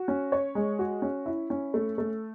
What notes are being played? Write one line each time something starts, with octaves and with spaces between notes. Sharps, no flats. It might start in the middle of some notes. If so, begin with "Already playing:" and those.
Already playing: F#4
C#4
C#5
G#3
F#4
C#4
E4
C#4
A3
A3